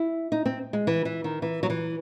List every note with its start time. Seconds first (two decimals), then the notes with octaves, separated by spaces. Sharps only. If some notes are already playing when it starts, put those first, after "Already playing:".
Already playing: E4
0.32 D#4
0.46 C4
0.73 G#3
0.87 E3
1.05 E3
1.24 D#3
1.42 E3
1.63 F#3
1.70 E3